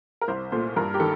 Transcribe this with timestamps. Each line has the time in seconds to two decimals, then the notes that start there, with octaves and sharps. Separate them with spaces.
0.21 A#4
0.28 C2 C5
0.52 A#2 A3 C5
0.76 G2 A#4
0.94 G4
1.00 D#3 G3 A4